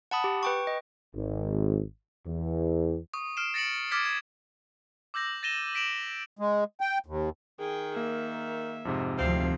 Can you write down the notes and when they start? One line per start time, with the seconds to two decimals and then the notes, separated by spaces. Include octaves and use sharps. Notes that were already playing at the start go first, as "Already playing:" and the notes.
0.11 F#5 A5 B5 D#6
0.24 G4
0.43 B4 G5 C#6
0.67 D#5
1.14 G#1
2.26 E2
3.13 C#6 D#6
3.37 F6 C7 D7 E7
3.54 A6 A#6 C#7 D7 F#7
3.91 D6 F6 G#6 A6 B6 D7
4.06 G#6
5.14 D6 E6 G6 A#6 F#7
5.43 A6 A#6 D#7 E7 G7
5.75 B6 D7 E7 F#7
6.39 G#3
6.81 G5
7.06 D#2
7.59 D#3 G#4 G5
7.96 A#3 E5
8.85 F2 G#2 C3
9.18 D2 D#3 F3 C4 F5